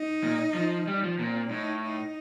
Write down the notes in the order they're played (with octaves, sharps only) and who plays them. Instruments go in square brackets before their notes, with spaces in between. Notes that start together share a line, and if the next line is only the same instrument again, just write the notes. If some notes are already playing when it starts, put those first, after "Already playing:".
Already playing: [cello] D#4
[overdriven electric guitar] A#2
F3
G3
F3
[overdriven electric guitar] A#2 [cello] C4
[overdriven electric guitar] A2 [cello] D#4
[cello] D#4